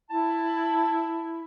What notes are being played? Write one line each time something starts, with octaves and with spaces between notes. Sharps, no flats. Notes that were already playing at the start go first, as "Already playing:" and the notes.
E4 A5